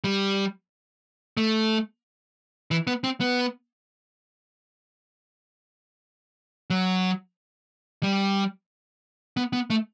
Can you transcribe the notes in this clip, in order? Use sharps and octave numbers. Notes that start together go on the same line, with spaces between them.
G3
A3
E3
B3
C4
B3
F#3
G3
B3
B3
A3